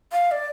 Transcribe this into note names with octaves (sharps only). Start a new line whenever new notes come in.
F5
D5